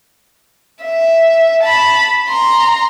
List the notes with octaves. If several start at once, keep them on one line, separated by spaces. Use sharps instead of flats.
E5
A5 B5
A#5 C6